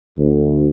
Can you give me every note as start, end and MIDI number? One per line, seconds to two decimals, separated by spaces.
0.18 0.69 38